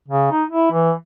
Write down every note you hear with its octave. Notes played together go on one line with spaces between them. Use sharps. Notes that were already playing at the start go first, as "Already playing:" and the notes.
C#3
D#4
E4
E3